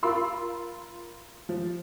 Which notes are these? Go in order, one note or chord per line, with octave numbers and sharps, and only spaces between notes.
F4 A#4 B5 C6 E6
F3